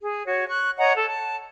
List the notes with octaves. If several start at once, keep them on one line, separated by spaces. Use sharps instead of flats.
G#4
F#4 C#5
C#6 F#6
C#5 D#5 F#5 A#5
A4
A5